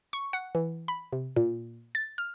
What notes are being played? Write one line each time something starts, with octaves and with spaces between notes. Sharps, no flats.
C#6
F#5
E3
B5
C3
A#2
A6
F6